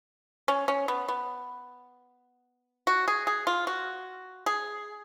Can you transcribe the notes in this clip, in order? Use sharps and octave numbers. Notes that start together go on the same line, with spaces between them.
C#4
C#4
B3
B3
F#4
G#4
G#4
F4
F#4
G#4